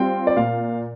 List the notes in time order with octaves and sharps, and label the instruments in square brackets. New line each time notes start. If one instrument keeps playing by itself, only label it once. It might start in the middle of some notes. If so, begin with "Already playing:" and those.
Already playing: [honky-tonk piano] G3 C4 F4 [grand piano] G5
[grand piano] D5
[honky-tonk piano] A#2 [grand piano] F5